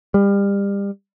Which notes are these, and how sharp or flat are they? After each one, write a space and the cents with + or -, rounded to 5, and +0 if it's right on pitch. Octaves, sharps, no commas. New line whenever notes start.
G3 +30